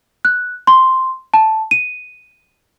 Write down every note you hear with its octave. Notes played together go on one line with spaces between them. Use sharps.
F#6
C6
A5
D#7